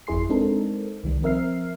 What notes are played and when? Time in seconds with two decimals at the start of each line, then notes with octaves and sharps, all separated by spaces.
0.07 G1 F2 E4 G#4 C6 C7
0.29 G#3 C4 D4 D#4 A4 A#4
1.03 C2 D#3 G3
1.22 F3 C4 A#4 E5 F6 C7